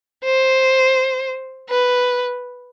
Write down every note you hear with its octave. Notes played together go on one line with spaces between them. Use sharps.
C5
B4